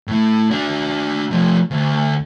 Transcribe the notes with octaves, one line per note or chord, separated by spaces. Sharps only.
A2 A3
D4 F#4
F3 A3
D2